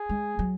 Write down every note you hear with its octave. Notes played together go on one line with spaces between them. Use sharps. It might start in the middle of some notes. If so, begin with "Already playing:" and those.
Already playing: G#4
G#3
F#3